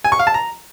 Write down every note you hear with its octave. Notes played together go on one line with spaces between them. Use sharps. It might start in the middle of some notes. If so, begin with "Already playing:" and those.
G#5
C#6
F5
A5
A#5